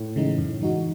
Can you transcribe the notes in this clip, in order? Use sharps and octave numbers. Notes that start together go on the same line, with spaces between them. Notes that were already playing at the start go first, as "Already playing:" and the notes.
Already playing: A2
C#3 E3 G#3 D#4
F#2
E3 G#3 D#4 F#4